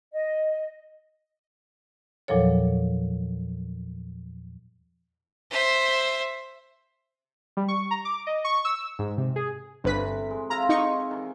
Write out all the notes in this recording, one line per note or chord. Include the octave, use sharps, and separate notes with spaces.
D#5
E2 A#2 F3 F#3 A4 C#5
C5 E5
G3
C#6
A#5
D6
D#5
C#6
E6
G#2
C3
G#4
G1 A2 C3 E3 B4 B6
G#3
C3 E4 F4 A#5
D#4 C#6
D#3 E3